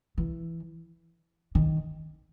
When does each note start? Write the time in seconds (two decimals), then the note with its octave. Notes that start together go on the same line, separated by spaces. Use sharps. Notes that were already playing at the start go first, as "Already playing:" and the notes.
0.18 E3
1.55 D#3